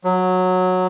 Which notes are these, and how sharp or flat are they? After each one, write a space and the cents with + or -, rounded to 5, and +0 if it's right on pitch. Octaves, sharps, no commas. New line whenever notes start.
F#3 -10